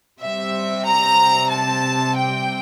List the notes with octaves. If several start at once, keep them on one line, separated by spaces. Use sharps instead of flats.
C3 G3 C4 E5
A#5
A5
G5